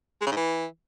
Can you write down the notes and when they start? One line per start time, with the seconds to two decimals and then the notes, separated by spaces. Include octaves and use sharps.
0.22 G#3
0.27 C#3
0.32 G#2
0.37 E3